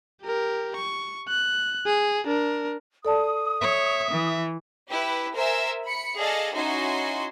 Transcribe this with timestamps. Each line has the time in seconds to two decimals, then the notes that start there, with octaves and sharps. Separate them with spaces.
0.23 G4 A#4
0.76 C#6
1.28 F#6
1.86 G#4
2.26 D4 A#4
3.05 A4 D5 A5 D#6
3.61 C#5 E5
4.11 E3
4.90 E4 G4 B4
5.35 A#4 C5 E5 G#5 E6
5.84 B5 C#7
6.17 G#4 A4 D5 D#5 F5 A5
6.54 C#4 D#4 E4 F#4 G#5 C6